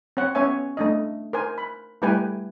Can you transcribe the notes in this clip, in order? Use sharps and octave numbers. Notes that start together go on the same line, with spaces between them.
C4 C#5 F#5
B3 C#4 C#5 E5 G#5
A3 D4 D#5
A#4 C5 G#5
B5
G3 A3 E4 B4 G5 G#5